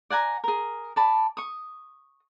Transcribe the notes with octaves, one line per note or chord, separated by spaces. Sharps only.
D5 F#5 G#5 A#5
G#4 A#4
D5 A5 B5
C#6 D#6